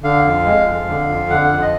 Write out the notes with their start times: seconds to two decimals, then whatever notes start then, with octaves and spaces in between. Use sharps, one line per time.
0.03 D3 F5
0.25 F2
0.46 G#3
0.67 F2
0.88 D3
1.09 F2
1.30 D3 F#5
1.51 F2
1.62 D#5